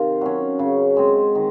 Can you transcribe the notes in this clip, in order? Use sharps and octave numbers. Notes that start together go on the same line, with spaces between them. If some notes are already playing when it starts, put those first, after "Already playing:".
Already playing: C3 D#3 A#4 C5 F5
F#3 C#4
C#3
G#3 C4
D#3